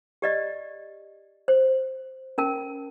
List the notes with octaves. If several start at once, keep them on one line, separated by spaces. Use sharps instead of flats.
G4 D5 D#5
C5
C#4 A#4 A5